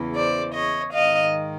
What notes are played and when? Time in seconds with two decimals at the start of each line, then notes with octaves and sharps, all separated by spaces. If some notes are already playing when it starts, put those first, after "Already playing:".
Already playing: E2 C#3 E3
0.15 C5 D5
0.54 C#5 D#5
0.92 G#2 D#3 D#5 F5